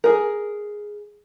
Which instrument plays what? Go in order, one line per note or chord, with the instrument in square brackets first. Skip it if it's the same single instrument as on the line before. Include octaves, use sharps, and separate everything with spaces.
[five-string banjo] G#4 A#4